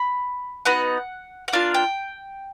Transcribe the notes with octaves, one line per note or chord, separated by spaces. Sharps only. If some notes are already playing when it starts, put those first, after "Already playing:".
Already playing: B5
B3 D#4 F#4 F#5
F#5
A#3 D4 F4 F5
G5